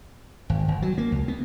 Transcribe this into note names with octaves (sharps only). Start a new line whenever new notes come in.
G#1
G1
F#3
A#3
C#2
B3